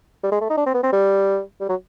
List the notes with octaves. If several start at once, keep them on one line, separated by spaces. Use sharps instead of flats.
G3
G#3
A3
D#4
D4
C4
B3
C4
G3
G3
F#3